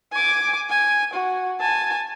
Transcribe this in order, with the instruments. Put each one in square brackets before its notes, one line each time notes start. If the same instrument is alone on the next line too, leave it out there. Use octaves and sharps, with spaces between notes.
[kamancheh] G#5 D6
G#5
F#4
G#5 A5